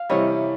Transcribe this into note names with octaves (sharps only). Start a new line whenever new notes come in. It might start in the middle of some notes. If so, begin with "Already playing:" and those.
Already playing: F5
C3 E3 G3 C#5 D#5